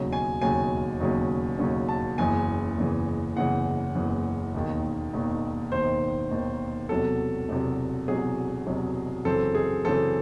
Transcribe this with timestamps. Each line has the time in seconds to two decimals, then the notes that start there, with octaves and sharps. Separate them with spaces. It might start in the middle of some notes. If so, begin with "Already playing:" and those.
Already playing: E1 D#2 C#3 F#3 C#4
0.13 G#5
0.42 E1 D#2 C#3 F#3 C#4 G#5
1.00 E1 D#2 C#3 F#3 C#4
1.59 E1 D#2 C#3 F#3 C#4
1.89 A5
2.18 F#1 E2 C#3 E3 G#5
2.78 F#1 E2 C#3 E3
3.37 F#1 E2 C#3 E3 F#5
3.95 F#1 E2 C#3 E3
4.54 E1 D#2 D#3
5.14 E1 D#2 D#3
5.72 E1 D#2 D#3 C5
6.31 E1 D#2 D#3
6.89 E1 E2 C3 F#3 A4
7.49 E1 E2 C3 F#3
8.08 E1 E2 C3 F#3 G#4
8.66 E1 E2 C3 F#3
9.25 F#2 C#3 E3 C4 A4
9.55 G#4
9.85 F#2 C#3 E3 C4 A4